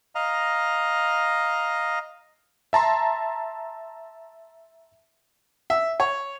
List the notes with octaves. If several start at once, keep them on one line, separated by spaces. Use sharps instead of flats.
D#5 F5 A#5
E5 A5 A#5 C6
E5
C#5